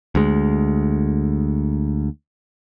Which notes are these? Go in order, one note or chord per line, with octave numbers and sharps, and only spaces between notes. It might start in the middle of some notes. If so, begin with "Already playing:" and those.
D2 G#3